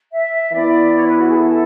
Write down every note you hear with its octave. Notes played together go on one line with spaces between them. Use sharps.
E5
E3 B3 E4 D5
C#5
B4
F#4
G#4
A4